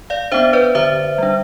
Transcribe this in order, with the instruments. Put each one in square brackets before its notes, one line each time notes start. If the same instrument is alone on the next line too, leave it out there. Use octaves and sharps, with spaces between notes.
[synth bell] D5 F5
B3 D4 C5 E5
B4 D5
D3 C5 E5
G3 D4